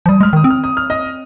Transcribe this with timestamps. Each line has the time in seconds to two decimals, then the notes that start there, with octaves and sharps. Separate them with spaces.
0.06 F3
0.09 G3 D#6
0.20 G#3 F6
0.33 D#3 D#6
0.44 C4
0.50 F6
0.64 D#6
0.77 F6
0.90 D#5 D#6